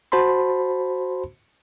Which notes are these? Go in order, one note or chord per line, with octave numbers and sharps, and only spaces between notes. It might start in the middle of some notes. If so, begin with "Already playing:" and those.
F#4 C5 A5 B5 C6